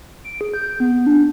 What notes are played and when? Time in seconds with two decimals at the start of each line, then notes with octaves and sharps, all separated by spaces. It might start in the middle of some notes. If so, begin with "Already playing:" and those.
0.24 D7
0.41 G#4
0.54 G6
0.80 B3
1.06 D4